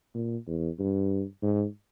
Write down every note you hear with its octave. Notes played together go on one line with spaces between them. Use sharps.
A#2
E2
G2
G#2